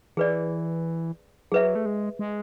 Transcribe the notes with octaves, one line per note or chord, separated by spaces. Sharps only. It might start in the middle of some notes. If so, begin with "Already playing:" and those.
E3 G#4 B4 D5
F#3 G#4 B4 E5
A3
G#3
G#3